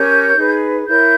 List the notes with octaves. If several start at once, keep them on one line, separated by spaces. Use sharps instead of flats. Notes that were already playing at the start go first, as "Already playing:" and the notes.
Already playing: C#4 G4 A#4 C#5 G6
D#4 G#4 B4
E4 A#4 C#5 G6